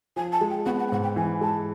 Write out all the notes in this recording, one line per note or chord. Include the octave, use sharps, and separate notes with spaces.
F3 G#5
A5
G#3
G5
B3 F#5
F#5
G5
G#2 F#5
G5
E3 G#5
G#3 A5